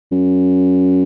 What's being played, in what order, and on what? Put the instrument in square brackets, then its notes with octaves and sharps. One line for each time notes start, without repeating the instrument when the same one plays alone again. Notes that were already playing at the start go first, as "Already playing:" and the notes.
[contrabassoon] F#2